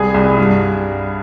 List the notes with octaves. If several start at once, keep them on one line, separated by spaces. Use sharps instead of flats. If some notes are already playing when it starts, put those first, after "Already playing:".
Already playing: C2 G#4 G#5
C2
G2